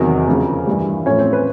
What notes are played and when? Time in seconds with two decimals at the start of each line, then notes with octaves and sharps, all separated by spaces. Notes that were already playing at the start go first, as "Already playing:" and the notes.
Already playing: E2 C3 D#3 F#3 A#4
0.27 F2 C#3 F3
0.67 G2 E3 G3
1.06 A2 F3 C#4 C#5
1.19 C4 C5
1.33 B4